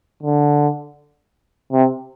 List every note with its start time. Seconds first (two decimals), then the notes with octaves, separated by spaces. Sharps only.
0.23 D3
1.71 C3